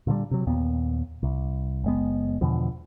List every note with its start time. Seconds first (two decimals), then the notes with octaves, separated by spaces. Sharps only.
0.07 A#2 D3 F3 G3
0.31 C3 F#3
0.47 D#2 A#2 B3
1.23 C2
1.84 F#1 G#3 B3
2.41 E2 B2 D3 F3